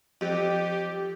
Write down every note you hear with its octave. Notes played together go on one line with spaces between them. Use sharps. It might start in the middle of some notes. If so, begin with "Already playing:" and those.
F2 G4